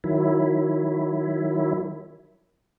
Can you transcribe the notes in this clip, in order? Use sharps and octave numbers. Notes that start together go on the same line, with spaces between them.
D#3 F#3 E4